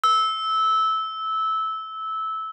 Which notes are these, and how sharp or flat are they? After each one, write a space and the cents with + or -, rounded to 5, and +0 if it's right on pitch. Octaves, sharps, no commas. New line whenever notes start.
E6 -15